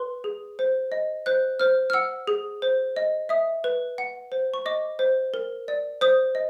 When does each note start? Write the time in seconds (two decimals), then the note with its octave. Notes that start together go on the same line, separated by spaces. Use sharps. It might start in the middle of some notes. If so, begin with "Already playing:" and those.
Already playing: B4 C6
0.24 G#4
0.59 C5
0.92 D#5
1.26 C5 F#6
1.60 C5 F6
1.90 F6
1.93 F#5 E6
2.27 G#4
2.62 C5
2.96 D#5
3.29 E5 D#6
3.64 B4
3.98 F#5
4.32 C5
4.54 C#6
4.66 D#5 D6
4.99 C5
5.34 A#4
5.68 D5
6.01 C5 D#6
6.35 D#5